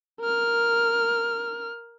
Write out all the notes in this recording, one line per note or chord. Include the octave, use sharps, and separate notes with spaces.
A#4 F6